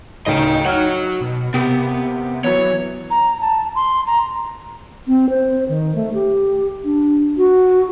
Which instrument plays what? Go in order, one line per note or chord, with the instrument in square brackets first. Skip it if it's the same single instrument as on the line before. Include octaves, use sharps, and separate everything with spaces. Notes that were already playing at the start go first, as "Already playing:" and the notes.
[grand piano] D1 C#3 A3 [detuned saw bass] D#4 [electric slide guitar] D#5 G5
[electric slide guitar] F#4 C#5 [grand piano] F#5 F6
[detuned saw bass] B2
[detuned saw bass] C3 [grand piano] A#3 G4 [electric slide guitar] B3
[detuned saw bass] E3 [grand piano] F#3 B3 [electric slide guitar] C#5
[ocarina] A#5
A5
C6
A#5
[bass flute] C4
C5
D#3
A3
G4
D4
F#4